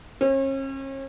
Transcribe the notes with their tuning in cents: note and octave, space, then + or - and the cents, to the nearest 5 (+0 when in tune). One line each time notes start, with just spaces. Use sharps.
C#4 -40